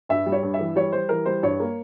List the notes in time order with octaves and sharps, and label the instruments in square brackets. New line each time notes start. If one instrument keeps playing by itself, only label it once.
[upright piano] G2 E5
G3
C#5
G2
E5
E3
G3 C#5
G3 C5
E3 A#4
G3 C5
G2 C#5
A#3